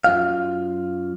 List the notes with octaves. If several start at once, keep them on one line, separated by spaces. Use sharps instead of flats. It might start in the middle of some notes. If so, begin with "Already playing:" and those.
F#2 F4 F5